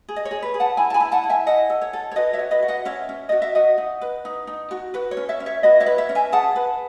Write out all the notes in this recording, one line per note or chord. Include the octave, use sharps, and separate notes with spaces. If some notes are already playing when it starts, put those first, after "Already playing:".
G#4
D#5
C#5
G#4
B4
G#4
F#5 A5
E4 G#5 B5
A5
G#5 B5
E4
F#5 A5
E4
E5 G#5
E4 D#5 F#5
A4
C#5
A4
C#5
F#4 B4 D#5
C#5 E5
F#4
B4 D#5
F#4
D#5 F#5
C#4 C#5 E5
C#4
F#4 D#5
E5
F#4 D#5 F#5
D#4
B4
D#4
D#4
F#4
F#4 B4
C#5
C#4
C#5 E5
C#4
C#5 E5
F#4 B4 D#5
C#5 E5
B4
C#5 E5
C#4
E5 G#5
G#4 F#5 A5
B4